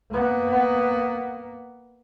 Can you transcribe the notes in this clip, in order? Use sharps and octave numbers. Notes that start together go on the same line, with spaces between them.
A#3 B3